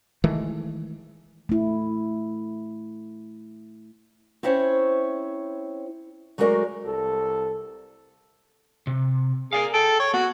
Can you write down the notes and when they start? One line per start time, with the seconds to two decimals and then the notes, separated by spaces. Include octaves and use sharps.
0.24 D#3 E3 G#3 A3
1.49 A3 E4
4.43 C4 C#4 E4 C5 C#5
6.38 F#3 G#3 A3 F#4 A#4 D5
6.86 C2 A4
8.87 C3
9.53 G#4 A#4 D5 F5
9.74 A4 G5
10.00 C#5
10.14 B3 F#4